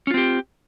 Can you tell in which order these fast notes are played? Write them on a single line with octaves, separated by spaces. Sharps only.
C#4 F4 C4 G4